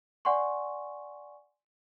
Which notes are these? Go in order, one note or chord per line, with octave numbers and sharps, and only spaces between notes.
D5 F#5 G#5 C6 C#6